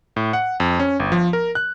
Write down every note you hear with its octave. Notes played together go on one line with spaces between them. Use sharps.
A2
F#5
F2
C#4
G1
F3
A#4
F#6